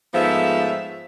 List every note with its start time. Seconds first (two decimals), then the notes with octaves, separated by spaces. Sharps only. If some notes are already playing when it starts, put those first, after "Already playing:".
0.14 G#2 F3 A3 B3 E5